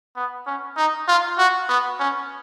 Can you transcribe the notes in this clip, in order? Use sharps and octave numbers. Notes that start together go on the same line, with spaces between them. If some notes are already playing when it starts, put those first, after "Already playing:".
B3
C#4
D#4
F4
F#4
B3
C#4